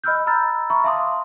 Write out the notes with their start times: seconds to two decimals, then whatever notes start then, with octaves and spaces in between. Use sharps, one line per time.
0.04 D#5 B5 E6 F6 G6
0.27 A#5 B5 E6 F6 A6
0.70 E5 A#5 B5 C#6
0.84 E5 F5 A5 C6 D6 D#6